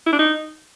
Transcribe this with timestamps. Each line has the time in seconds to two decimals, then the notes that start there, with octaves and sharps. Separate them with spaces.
0.06 E4
0.13 D4
0.19 D#4